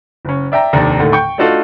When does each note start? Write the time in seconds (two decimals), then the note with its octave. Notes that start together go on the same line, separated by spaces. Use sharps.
0.25 F#1 C#4
0.52 D5 E5 G5 A#5
0.73 F1 D#2 D4 A4 A#5
0.99 A2 D3 D#3 A3
1.12 G5 C#6 G6
1.38 A3 D4 D#4 F4 F#4 A4